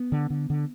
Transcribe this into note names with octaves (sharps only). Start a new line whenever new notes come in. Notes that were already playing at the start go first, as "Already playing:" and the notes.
Already playing: B3
D3
D3
D3